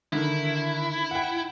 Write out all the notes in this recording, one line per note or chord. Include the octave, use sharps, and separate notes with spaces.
D3 D#3 E4
F#5 G5